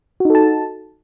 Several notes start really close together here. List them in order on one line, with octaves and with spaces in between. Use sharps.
F#4 D#4 A4 A5